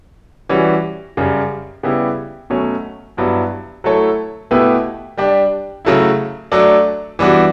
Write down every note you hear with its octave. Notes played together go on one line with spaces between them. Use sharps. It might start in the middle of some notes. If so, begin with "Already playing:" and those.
E3 G3 C#4 F#4
F#2 C#3 G3
C#3 G3 B3 E4 G4
B2 F#3 A3 C#4
G2 F#3 B3 E4
F#3 A3 E4 A4 C#5
B2 A3 E4 G4 B4
G3 D4 G4
C#3 F#3 A3 E4
F#3 A3 D4 A4 D5
E3 G3 B3 D4 F#4